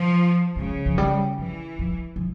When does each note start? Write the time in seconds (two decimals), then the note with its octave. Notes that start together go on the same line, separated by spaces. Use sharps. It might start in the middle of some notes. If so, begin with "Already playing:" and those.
Already playing: F3
0.56 C#3 G#3
0.86 F3
0.98 G3
1.38 E3 F3
1.79 F3
2.16 F3